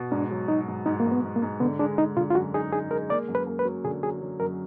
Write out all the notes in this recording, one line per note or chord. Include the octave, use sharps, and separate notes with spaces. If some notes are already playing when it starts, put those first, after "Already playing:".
Already playing: B2
G#2 D4
F#3
F#3 D#4
G#2
G#2 D#4
G#2 A#3
B3
G#2
A#3
G#2
D3 B3
G#3 D4
G#3 D#4
D3 F4
F4
F#2 F#4
D#4 G#4
D#4 G#4
G#3 A#4
A#3 D5
F#2
B4
A#3
B4
F#3
D3 G#4
F#3 G#4
F#3
F#2 A#4